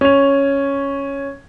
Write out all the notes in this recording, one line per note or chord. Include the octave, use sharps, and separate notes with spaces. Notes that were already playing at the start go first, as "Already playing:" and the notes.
C#4 F7